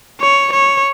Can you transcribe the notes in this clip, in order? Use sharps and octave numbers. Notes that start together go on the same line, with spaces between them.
C#5
C#5